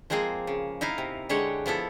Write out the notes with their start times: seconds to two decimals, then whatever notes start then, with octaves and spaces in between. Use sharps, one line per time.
0.10 F3 G#3 A#3 C4 G#4
0.47 C#3
0.81 D#4 E4 A#4 F5
0.98 C3
1.29 D3 G#3 G4 C#5 F#5
1.66 F3 B3 E4 A4